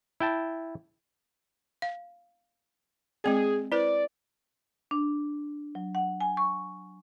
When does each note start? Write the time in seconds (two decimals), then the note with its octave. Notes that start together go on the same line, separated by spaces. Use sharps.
0.20 E4 G5 A5
1.82 F5
3.24 G#3 C4 G#4 D5
3.72 E4 B4 C5 D5
4.91 D4
5.75 F#3
5.95 F#5
6.20 G#5
6.37 C#6